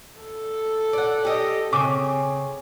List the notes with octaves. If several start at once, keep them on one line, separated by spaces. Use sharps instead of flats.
A4
D5 F#5
G4 D#5
C#3 C4 D6